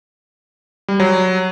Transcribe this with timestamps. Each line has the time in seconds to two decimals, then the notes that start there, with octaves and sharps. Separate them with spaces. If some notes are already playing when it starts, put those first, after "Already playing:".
0.88 G3
1.00 F#3